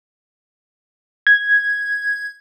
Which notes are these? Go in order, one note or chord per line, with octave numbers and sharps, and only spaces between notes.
G#6